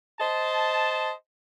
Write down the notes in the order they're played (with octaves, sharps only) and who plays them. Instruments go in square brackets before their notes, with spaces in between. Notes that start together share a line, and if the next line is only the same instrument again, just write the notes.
[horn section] C5 D#5 A5